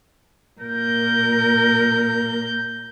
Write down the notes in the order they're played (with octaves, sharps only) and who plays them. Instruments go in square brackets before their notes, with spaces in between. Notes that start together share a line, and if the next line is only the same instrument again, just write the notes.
[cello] A#2 A#4 [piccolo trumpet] G6